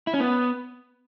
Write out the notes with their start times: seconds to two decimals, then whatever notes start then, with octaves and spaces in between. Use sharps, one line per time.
0.07 E4
0.14 C#4
0.20 B3